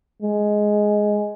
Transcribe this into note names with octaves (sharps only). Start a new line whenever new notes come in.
G#3